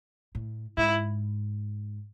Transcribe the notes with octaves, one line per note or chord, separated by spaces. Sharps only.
A2
G#2 E4